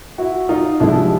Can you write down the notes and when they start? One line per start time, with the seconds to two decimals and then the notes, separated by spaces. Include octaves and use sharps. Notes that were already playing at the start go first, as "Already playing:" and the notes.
0.18 E4 F#4
0.49 D#4 F4
0.80 C2 C3 F3 G#3 D4 E4